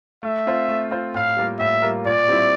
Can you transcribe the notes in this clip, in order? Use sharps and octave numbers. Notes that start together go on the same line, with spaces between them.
A3 E5
C4 F4 C5
A3
C4 F4 C5
A2 F5
G3 A#3 F4 A#4
A2 E5
G3 A#3 F4 A#4
A#2 D5
G3 C4 E4